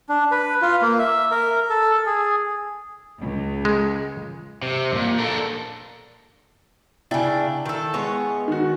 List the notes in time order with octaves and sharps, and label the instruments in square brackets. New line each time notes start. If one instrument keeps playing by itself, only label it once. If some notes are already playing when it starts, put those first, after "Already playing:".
[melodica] D4
B4
F4
A#3
E5
A#4
A4
G#4
[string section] C#2
[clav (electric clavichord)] G#3
[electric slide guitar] C3
F#2 A#2
D4 A4 A#4
[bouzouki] C#3 D4 [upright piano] E4 G5
[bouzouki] D#3 A4
G#3 B3 C#5
[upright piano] D#3 F#4